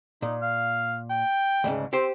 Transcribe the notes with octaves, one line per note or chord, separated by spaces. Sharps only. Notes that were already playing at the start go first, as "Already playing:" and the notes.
A#2 D#4
F5
G5
D2 G#2 C#3
C4 G4 C5